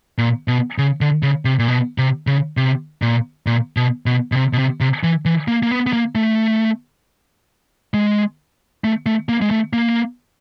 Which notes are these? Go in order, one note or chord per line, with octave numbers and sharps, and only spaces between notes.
A#2
B2
C#3
D3
C#3
C3
A#2
B2
C3
C#3
C3
A#2
A#2
B2
B2
B2
C3
B2
C3
C3
E3
E3
A#3
A#3
B3
B3
A#3
A3
G#3
A3
A3
A#3
G#3
A3
A#3